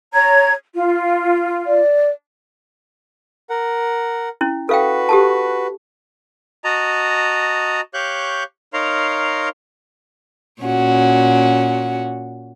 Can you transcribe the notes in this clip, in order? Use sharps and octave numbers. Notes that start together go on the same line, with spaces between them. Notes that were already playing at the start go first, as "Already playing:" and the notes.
C#5 A#5 G#6
F4
D5
A#4 F#5
C#4 E4
F#4 A4 B4 F5 G5
G4 A4 A5
F#4 D#5 A5 A#5
G4 C#5 F5 C#6 F#6 G6
D#4 A#4 C#5 F5 A#5 C6
A#2 C#4 F#4